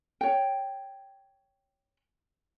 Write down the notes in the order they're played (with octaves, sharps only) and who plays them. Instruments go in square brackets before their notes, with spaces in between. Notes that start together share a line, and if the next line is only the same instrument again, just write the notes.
[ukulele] C#5 G5